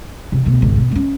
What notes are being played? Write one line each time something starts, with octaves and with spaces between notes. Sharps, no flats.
C3 E3
D2 B2
G#1 C#2
B2
A#3 C#4